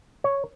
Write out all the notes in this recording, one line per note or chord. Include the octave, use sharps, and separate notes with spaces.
C#5